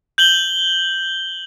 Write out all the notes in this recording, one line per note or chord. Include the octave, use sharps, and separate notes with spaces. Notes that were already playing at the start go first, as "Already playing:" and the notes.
G6 F#7 G7